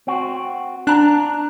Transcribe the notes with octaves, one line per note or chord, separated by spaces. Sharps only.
C4 F#4
D4 A5 A#5 F#6